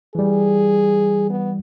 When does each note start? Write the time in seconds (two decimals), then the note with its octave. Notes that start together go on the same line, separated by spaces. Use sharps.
0.15 E3 G3 G#4
1.30 B3